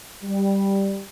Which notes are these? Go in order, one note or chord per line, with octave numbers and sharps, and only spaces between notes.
G3